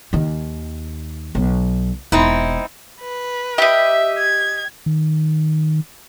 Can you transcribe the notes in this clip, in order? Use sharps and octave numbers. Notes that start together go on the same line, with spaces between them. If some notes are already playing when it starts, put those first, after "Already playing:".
D#2 D#3
B1 F#3
E1 C4 D#4 E4
B4
G4 D#5 E5
G#6
D#3